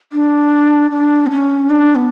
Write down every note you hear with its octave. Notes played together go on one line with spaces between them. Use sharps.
D4
D4
B3
C#4
D4
B3